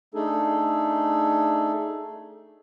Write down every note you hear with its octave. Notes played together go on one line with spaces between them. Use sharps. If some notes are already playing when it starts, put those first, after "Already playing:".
A3 D4 D#4 G#4 A4